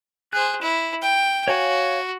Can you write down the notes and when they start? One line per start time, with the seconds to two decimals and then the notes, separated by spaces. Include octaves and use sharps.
0.33 G#4 C5 F#6
0.61 E4
1.02 G5
1.48 F#4 C#5 F5 G#5